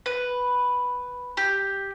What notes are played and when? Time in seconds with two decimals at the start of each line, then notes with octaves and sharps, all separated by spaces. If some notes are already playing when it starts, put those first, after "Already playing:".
0.06 B4
1.37 G4